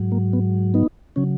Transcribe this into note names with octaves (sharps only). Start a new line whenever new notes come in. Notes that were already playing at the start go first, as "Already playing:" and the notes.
Already playing: G#2 F#3
A#3
B3
B3 D#4
C#3 F#3 C#4